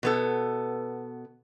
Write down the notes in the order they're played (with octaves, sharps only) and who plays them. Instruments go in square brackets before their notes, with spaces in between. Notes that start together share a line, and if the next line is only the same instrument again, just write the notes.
[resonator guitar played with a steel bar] B2 B3 A4